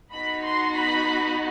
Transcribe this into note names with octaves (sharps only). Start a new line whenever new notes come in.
B3 D#4 F#4 B5
C6
B5